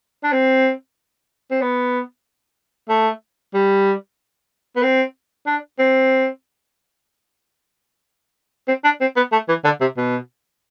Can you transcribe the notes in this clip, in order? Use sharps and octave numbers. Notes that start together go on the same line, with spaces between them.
D4
C4
C4
B3
A3
G3
B3
C4
D4
C4
C4
D4
C4
B3
A3
E3
D3
C3
B2